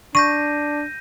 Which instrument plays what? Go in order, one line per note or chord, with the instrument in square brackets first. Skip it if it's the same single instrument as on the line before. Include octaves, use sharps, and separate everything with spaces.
[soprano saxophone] D4 [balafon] C#6 [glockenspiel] G6 A#6 D#7